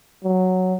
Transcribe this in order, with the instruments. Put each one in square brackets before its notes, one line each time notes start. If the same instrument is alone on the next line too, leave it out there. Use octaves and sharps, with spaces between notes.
[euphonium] F#3